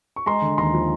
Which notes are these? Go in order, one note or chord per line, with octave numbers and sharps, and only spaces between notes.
C#6
G#3 A#5 C6
D3
D#2 A#5 C6
F3